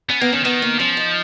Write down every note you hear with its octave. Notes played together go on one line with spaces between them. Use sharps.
B3 C#4
A#3 B3
D#3 C#4
D#3 B3
A#3
F3 C#4
D#4